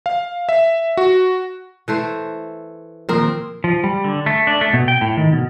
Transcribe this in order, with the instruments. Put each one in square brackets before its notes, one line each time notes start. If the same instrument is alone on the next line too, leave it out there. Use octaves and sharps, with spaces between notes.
[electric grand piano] F5
E5
F#4
[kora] E3 A3 C5
[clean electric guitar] D#2 A#2 F3 [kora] C4 A#4
[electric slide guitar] F3
G3
D3
A3
D4
A3
B2
G5
A2
D#3
B2